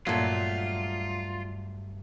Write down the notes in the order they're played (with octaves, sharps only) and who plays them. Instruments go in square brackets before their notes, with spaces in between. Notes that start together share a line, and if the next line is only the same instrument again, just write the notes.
[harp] G2 [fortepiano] A#2 [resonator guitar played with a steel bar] F#3 A3 [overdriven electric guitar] F4